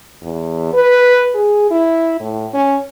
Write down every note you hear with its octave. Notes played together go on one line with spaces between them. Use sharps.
E2
B4
G#4
E4
A2
C#4